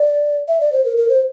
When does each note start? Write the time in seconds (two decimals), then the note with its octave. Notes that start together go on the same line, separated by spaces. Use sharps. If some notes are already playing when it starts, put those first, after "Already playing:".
Already playing: D5
0.48 E5
0.60 D5
0.72 C5
0.85 A#4
0.97 A#4
1.09 C5